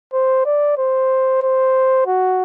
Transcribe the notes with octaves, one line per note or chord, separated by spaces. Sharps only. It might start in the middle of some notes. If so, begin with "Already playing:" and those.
C5
D5
C5
C5
F#4